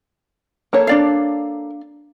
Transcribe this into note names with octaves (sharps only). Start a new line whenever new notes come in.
A#3 A4 C#5
D4 D5 F5